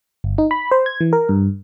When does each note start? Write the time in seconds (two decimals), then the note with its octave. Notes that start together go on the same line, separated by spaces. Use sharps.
0.24 G1
0.38 D#4
0.51 B5
0.71 C5
0.86 G#6
1.01 E3
1.13 A#4
1.29 G2